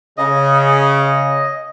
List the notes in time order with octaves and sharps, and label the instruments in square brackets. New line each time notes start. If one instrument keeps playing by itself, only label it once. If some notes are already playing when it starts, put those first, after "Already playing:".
[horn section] C#3 [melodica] D#5